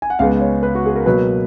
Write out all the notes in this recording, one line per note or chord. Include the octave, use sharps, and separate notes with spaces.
G#5
F#5
C#2 C#3 G#3 B3 F5
C#5
B4
F#4
G#4
A#4
B2 F#3 A#3 B4